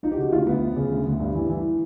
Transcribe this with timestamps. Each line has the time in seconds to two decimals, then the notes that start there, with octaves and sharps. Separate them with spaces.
0.03 F3 D#4
0.12 G4
0.17 C#3 F#4
0.32 D2 F4
0.47 D2 B3
0.61 F3
0.76 C#3
0.91 D2
1.06 D2
1.20 G2
1.35 E3
1.50 E3